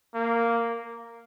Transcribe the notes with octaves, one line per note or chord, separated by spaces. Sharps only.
A#3